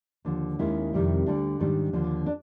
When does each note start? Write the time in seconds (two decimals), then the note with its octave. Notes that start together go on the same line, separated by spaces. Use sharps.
0.25 D#2 D3 F3
0.59 D#2 D#3 G#3 C#4 E4
0.93 F2 C3 D#3 G3 C4
1.26 D2 D3 G3 D4
1.60 G#2 D#3 G3 D4
1.93 D#2 D3 F3
2.26 D4